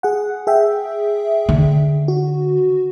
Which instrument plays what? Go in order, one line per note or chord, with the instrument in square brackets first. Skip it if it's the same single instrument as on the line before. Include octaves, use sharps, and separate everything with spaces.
[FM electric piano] G#4 F#5
G#4 E5 G5
[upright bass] D3
[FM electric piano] F#4